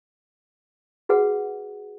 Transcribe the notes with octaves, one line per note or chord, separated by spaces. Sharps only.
F#4 G#4 B4 F#5